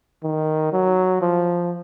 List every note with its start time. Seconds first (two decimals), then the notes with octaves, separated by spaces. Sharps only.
0.24 D#3
0.72 F#3
1.21 F3